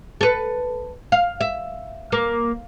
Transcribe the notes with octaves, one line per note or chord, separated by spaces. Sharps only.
A4 B4
F5
E5
A#3